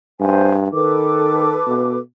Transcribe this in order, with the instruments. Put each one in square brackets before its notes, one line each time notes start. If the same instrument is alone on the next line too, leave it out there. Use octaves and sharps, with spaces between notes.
[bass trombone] G2 [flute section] C5 G#5
[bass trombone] D#3 [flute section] A4 B4 D6
[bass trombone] B2